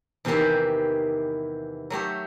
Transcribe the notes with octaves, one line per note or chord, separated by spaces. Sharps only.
E2 C3 D#3 E3 C4 G4
F#3 A3 G4 C#5